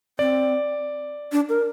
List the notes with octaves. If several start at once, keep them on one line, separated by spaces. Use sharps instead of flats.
C4 D5
D4
A#4